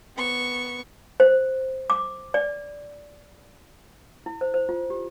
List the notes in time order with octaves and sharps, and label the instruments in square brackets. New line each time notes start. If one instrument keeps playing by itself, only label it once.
[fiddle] B3 C#6
[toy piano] C5
D6
D5
E4
C5
C5
F4
G4